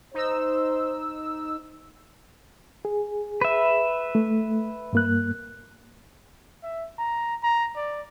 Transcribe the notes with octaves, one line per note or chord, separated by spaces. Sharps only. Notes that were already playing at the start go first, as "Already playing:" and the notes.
D#4 C5 E6
G#4
B4 E5
A3
G2 A#3 F#6
E5
A#5
A#5
D5